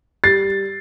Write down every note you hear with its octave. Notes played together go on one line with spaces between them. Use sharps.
G3 A6 C7